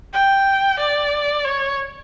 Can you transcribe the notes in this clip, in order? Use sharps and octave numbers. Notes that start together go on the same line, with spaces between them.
G5
D5
C#5